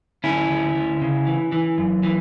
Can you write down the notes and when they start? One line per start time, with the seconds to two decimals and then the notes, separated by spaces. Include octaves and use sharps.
0.24 D2 C#4 E4
0.49 D2
0.75 D2
1.02 C#3
1.27 E3
1.52 E3
1.78 F#2
2.03 E3